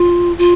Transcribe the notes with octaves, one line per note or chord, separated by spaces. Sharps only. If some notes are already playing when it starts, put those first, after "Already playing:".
Already playing: F4
F4